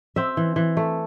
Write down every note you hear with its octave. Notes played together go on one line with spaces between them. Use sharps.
C4 E5
E3
E3
A3